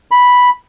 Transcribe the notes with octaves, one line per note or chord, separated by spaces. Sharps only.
B5